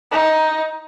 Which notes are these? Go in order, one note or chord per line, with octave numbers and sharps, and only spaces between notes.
D#4